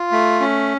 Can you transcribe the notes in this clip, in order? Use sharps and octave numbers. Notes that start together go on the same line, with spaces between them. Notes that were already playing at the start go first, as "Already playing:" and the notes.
Already playing: F4
A3
C#4